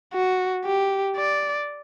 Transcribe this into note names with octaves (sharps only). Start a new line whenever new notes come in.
F#4
G4
D5